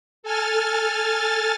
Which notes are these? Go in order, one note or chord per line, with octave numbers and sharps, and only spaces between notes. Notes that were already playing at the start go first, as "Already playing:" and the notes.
A4 G#5 F6 A6